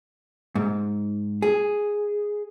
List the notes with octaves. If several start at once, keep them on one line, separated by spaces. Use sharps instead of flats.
G#2
G#4